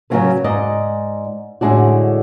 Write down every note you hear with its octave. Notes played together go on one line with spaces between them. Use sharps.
C#3 F#3 G#3 A#3 C#4 B4
G#2 D5 D#5
A2 D3 G#3 D4 F#4